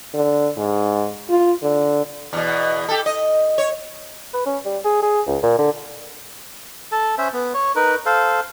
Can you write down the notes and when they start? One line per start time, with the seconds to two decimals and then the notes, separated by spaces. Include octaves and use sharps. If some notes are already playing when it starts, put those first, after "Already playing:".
0.14 D3
0.57 G#2
1.29 F4
1.62 D3
2.33 E2 B2
2.88 G4 A4
3.06 D#5
3.58 C#5
4.34 B4
4.46 C#4
4.66 G3
4.85 G#4
5.03 G#4
5.27 C#2
5.43 A#2
5.58 D3
6.92 A4 A5
7.18 C#4 C5 E5
7.33 B3
7.54 C#5
7.76 D#4 A#4 B4
8.06 A4 C5 F5